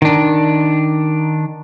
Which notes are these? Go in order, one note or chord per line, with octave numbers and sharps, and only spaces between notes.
D#3 D4